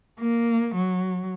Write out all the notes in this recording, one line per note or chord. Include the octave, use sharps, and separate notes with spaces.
A#3
F#3